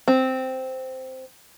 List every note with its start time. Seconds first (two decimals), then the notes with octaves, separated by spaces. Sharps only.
0.08 C4